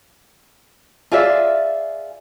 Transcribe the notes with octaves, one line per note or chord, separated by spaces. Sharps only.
F4 G#4 D5 E5